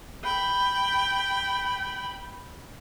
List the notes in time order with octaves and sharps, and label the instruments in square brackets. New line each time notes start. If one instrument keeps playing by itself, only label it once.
[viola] G5 [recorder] B5